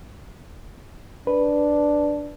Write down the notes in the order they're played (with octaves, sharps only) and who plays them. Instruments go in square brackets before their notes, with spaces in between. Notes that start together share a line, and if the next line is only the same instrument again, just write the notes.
[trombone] D4 [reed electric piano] B4